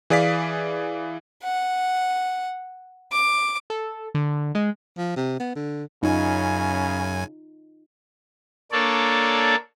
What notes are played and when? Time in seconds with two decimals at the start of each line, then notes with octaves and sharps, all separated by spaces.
0.10 E3 G#4 D5 F5 B6
1.44 F#5
3.12 D6
3.70 A4
4.15 D3
4.55 G#3
4.97 F3
5.16 C3
5.40 B3
5.56 D3
6.03 F#2 C#3 D#4 F4 G#5
8.72 A#3 D4 A4 C#5 D5